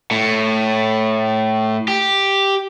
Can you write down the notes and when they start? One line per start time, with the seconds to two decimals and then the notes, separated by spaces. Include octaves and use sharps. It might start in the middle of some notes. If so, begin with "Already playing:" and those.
0.11 A2
1.88 G4